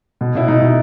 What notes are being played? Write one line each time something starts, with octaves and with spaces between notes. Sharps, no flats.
B2
B2 E4
B2 D#4
B2